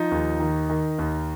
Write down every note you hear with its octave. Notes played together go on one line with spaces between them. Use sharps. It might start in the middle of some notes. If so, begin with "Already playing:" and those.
Already playing: F3 D#4
D#2
D#3
D#3
D#2